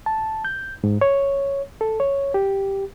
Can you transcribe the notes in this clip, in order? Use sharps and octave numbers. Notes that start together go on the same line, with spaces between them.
A5
G6
G#2
C#5
A4
C#5
G4